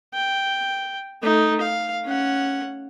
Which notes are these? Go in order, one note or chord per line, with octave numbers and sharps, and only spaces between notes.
G5
A3 D#4
F5
C#4 F#5